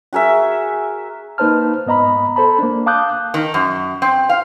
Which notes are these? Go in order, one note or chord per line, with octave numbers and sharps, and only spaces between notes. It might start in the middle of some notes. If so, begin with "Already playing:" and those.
F#4 G#4 A#4 E5
A#3 D#4 B4 C5 A5 F6
G#2 B3 D#5 A#5 B5
A4 C5 A5 B5
A#3 D4
F5 A5 D6 D#6 F#6 G6
D#3
F#2
C4
F5